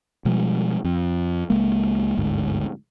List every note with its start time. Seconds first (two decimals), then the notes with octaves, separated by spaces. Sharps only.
0.25 B2 F3 G3 G#3
0.84 F2
1.50 C#2 G#3 A#3
2.17 G1 D2 G#2